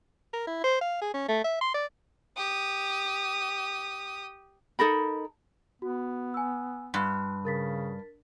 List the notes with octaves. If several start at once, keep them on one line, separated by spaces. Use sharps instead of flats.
A#4
E4
C5
F5
G#4
C#4
A3
E5
C6
D5
G4 D#6
D#4 A4 A#4 B5
B3 F#4
G#5 E6
G2 C6 F#6
C#3 A#4 A6 B6